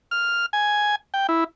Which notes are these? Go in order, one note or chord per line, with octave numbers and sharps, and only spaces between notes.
F6
G#5
G5
E4